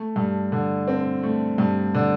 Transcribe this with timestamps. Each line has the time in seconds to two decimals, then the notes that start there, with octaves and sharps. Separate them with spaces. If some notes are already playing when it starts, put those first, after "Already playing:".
Already playing: A3
0.16 G2
0.52 D3
0.88 C4
1.23 A3
1.58 G2
1.95 D3